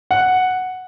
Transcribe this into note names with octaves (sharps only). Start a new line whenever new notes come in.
F#5